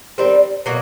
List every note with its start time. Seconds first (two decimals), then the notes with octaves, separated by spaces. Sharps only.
0.18 D#3 G3 C4
0.66 B2 F#3 A#3